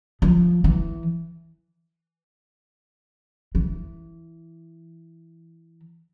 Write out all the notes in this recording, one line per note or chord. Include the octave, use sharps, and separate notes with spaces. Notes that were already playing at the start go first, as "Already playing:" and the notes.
F3
E3
E3